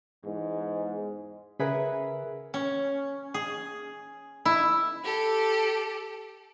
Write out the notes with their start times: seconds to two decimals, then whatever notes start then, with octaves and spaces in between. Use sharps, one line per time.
0.24 E2 G#2
1.59 C#3 G#4 A#4 B4 E5 F#5
2.54 C#4
3.34 G#4
4.45 E4
5.04 G4 A4